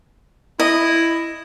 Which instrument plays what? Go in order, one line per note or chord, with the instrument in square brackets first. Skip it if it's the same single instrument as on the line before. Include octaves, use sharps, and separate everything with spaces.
[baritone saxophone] E4 [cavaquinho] D#5